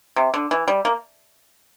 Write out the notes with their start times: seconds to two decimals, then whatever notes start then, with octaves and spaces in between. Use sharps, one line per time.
0.16 C3
0.34 D3
0.51 E3
0.68 G3
0.85 A#3